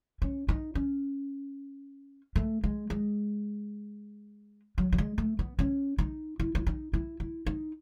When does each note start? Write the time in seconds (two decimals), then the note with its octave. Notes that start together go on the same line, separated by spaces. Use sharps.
0.22 C#4
0.49 D#4
0.75 C#4
2.36 A3
2.64 G#3
2.90 G#3
4.78 F#3
4.93 F#3
4.98 G#3
5.18 A3
5.39 B3
5.59 C#4
5.98 D#4
6.40 E4
6.55 E4
6.67 D#4
6.93 E4
7.20 E4
7.46 D#4